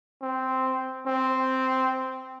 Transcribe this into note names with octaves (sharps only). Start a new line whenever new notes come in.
C4
C4